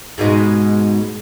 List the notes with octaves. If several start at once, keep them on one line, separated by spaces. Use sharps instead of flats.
G#2 B2 G#3